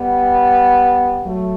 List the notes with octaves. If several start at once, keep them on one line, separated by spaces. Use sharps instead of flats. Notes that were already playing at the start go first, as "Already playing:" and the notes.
Already playing: G3 B3
F#3 A3